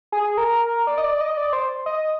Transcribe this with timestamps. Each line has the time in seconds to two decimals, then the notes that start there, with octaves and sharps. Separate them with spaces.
0.12 G#4
0.38 A#4
0.87 D5
0.98 D#5
1.04 D5
1.21 D#5
1.37 D5
1.53 C5
1.86 D#5